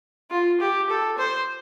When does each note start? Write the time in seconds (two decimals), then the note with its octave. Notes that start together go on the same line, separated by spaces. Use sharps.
0.30 F4
0.60 G4
0.89 A4
1.18 C5